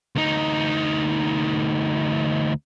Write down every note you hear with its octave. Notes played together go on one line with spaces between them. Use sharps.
D2 D#4